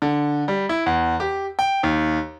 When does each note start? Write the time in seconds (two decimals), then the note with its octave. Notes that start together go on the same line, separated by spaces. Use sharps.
0.02 D3
0.48 G3
0.69 E4
0.86 E2
1.20 G4
1.59 G5
1.83 D#2